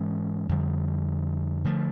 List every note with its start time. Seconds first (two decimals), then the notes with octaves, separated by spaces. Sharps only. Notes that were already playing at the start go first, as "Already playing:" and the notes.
Already playing: G#2 E3 G#3 C#4
0.49 F2 D3 G3
1.64 D3 F3 A3